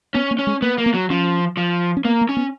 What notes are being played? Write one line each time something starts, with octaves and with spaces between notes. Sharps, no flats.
B3 C#4
A#3
C#4
G#3
A#3 B3
A#3
B3
F#3
F3 C#4
F3
C#4
A#3 B3
A#3
C#4
B3